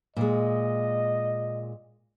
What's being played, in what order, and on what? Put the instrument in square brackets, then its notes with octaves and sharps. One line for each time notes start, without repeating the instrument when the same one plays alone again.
[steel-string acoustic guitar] A#2 G#3 [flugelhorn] D#5